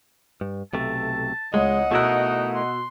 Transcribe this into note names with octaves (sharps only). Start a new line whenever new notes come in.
G2
B1 C3 A3 A5
C#2 G#3 C#5 D#5 F#5
B2 A3 D#4 E4 A#4 E6 F#6
C6